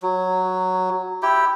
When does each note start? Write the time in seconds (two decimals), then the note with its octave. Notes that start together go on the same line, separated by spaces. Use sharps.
0.03 F#3
1.23 E4 G4 G5